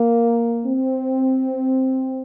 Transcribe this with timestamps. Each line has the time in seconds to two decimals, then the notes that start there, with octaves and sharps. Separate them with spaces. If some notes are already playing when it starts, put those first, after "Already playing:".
Already playing: A#3
0.65 C4